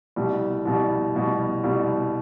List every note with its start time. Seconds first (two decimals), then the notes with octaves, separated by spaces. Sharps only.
0.16 C2 B2 G3
0.65 C2 B2 G3
1.15 C2 B2 G3
1.64 C2 B2 G3